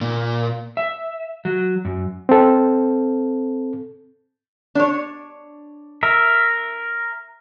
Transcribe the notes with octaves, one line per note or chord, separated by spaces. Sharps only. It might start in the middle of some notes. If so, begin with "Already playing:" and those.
A#2
E5
F#3
F#2
C4 A4
D4 C#5
A#4 E5